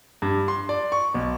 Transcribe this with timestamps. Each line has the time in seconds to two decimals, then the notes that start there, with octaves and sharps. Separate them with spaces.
0.22 G2
0.48 C6
0.69 D5
0.92 C#6
1.14 B1